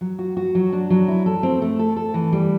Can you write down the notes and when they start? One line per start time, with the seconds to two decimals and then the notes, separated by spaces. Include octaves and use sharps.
0.01 F#3
0.19 F#4
0.37 F#4
0.55 F#3
0.72 D4
0.90 F#3
1.08 E4
1.26 A4
1.43 C4
1.62 A3
1.79 A4
1.96 A4
2.14 E3
2.32 G3